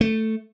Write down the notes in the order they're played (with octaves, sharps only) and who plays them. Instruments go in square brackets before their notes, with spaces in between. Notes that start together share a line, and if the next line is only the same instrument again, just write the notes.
[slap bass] A3